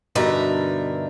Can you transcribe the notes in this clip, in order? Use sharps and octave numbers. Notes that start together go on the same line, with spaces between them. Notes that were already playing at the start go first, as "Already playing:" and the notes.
G2 B2 D3 D#4 A#4 E5